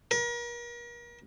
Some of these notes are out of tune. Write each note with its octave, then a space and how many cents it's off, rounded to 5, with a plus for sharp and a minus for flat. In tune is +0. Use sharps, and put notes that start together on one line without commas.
A#4 +40